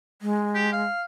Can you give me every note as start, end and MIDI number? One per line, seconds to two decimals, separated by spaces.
0.22 0.83 56
0.55 0.68 67
0.73 1.04 77